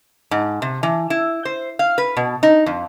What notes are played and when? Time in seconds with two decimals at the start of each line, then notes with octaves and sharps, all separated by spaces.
0.31 G#2
0.62 C3
0.83 E3
1.10 E4
1.45 C5
1.79 F5
1.98 B4
2.17 B2
2.43 D#4
2.66 F2